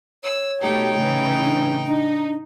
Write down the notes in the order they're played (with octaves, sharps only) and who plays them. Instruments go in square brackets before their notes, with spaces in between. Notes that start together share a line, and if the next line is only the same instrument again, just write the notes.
[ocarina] C#5 [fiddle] E6
[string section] B2 A3 G4 [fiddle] D#4 G5
[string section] A2 C#3 E3
[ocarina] D4
[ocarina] D4 [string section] D#4